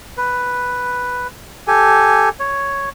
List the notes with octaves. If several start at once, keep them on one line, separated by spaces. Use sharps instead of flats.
B4
G4 A4 G#5
C#5